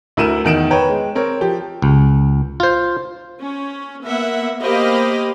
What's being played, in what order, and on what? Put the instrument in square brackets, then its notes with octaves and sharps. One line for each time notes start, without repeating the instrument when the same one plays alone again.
[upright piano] D2 E4 A#4 D#7 E7
E2 D#3 D7 E7
B4 C#5 G5 A#5
G#3
C4 A#4 C#5
F3 G4
[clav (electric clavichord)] C#2
F4 C5
[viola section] C#4
A#3 B3 E5 F#5
A#3 G4 C5 D#5 F5 B5